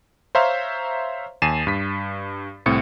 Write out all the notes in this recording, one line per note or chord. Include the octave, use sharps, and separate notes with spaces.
C5 C#5 E5 F5 A#5 C6
D#2 G#5 A6 C7 D#7 E7
G2 B6
C2 A2 C4 C#7